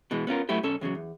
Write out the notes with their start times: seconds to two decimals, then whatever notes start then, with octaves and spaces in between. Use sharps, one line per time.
0.11 B2 E3 G#3
0.27 B3 C#4 F4 A#4
0.49 F#3 A3 B3 E4 G4
0.63 B1 C#4 A4
0.81 E2 C#3 F3 F#3
0.95 E2